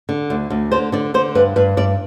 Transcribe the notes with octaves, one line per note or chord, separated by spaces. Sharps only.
D3
D2
D2
D3 C5
D3 D5
D3 C5
G2 B4
G2 B4
G2 D5